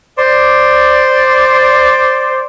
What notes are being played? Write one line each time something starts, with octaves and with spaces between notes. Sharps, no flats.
C5 D5